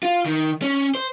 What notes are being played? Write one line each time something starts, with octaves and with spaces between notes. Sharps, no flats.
F4
D#3
C#4
C5